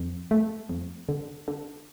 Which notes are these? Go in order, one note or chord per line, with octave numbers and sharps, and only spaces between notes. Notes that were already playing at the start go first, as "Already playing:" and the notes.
Already playing: F2
A3
F2
D3
D3